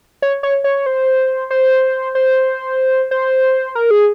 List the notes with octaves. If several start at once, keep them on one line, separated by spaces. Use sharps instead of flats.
C#5
C#5
C#5
C5
C5
C5
C5
A#4
G#4